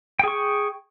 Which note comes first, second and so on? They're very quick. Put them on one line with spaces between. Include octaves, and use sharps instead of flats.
G5 G#4 C#6